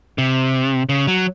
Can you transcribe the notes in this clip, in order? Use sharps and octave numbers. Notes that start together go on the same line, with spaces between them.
C3
C#3
F#3